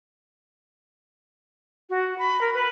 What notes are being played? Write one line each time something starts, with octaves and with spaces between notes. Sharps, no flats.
F#4
B5
A#4
B4